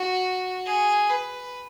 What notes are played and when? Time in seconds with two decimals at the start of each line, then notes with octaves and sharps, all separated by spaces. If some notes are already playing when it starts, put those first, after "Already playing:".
Already playing: F#4
0.65 G#4
1.09 B4